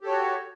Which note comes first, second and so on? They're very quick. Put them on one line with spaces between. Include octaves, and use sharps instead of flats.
G4 A4 C#5 F#4